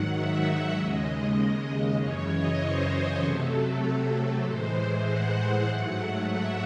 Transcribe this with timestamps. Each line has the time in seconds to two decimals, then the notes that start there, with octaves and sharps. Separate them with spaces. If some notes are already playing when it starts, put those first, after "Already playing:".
Already playing: G#2 D#3 F#3 F#5
0.15 E5
0.76 D#2 C#3 G#3 D#5
1.99 F#2 C#3 E3 C#5
2.30 D#5
2.60 C5
3.21 C3 F#3 A3 A4
4.44 A2 E3 G#3 C5
5.06 F#5
5.66 G#2 F#3 A3
6.28 E5